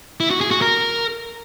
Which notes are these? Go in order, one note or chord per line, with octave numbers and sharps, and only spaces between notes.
E4
F#4
G#4
F#4
A#4